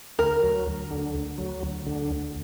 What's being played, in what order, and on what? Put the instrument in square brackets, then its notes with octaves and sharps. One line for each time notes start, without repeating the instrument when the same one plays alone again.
[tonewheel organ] D2 [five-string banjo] A#4
[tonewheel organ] F#3
D2
D3
D2
F#3
D2
D3
D2